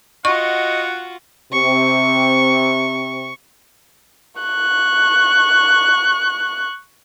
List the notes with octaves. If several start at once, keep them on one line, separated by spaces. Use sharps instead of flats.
F4 F#4 D#5 F#5 C#6
C3 C4 C#6
C#6 F#6